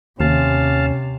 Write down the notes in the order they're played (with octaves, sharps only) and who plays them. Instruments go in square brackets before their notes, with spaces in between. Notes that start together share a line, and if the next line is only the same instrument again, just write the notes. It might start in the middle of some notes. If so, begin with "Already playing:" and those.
[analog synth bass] D#2 [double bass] C3 [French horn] C#4 [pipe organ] F5 A5